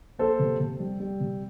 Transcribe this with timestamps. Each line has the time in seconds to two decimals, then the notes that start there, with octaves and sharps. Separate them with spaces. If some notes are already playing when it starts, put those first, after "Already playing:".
0.19 A#3 A4 C5
0.39 C3
0.60 C3
0.80 G3
1.00 G3
1.20 C3